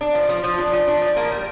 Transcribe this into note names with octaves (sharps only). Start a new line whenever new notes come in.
D4
F3
F3
F3
D4
F3
D4
F3
A#3
G3